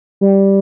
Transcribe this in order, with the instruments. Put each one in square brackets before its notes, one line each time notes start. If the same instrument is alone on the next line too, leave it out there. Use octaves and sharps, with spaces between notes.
[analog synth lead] G3